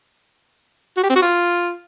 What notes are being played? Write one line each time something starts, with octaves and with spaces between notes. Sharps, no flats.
F#4
G4
C4
F#4
F4